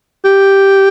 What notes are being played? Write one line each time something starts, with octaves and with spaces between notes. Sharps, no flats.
G4